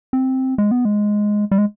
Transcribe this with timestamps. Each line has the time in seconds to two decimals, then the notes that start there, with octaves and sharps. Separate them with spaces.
0.13 C4
0.58 G#3
0.71 B3
0.85 G#3
1.51 G3
1.58 G#3